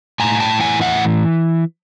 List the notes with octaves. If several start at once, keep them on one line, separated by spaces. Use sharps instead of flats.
A2 G#5 A#5
G5 A5
E3 F#5 G#5
E5 F#5